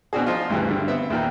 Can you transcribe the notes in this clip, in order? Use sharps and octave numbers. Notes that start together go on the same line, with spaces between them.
B2 C4 D4 F#4 G#4
F3 D#4 F4
D2 G2 C#3 E3
G2 D3
B3 C4 E5
E2 A#2 D#3